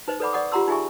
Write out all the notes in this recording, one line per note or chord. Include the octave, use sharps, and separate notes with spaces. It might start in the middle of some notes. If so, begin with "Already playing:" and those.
D#4 B4 C5 D#5
A4 B4 D5 F#5 B5 D6
D5 D#5 F#5 C#6 D#6
F4 G4 F#5 A#5 C6 E6
D#4 F4 G#4 E5 G#5 C#6